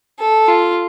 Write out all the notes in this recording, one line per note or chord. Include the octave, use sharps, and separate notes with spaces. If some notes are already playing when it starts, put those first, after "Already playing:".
A4
F4